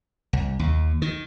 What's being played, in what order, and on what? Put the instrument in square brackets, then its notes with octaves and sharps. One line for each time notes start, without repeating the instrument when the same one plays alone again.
[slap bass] C2
D#2
D#3